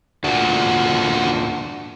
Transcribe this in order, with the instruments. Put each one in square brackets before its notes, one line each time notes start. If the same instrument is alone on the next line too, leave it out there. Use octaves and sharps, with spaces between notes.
[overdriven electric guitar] D2 A#2 [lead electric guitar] D4 F#4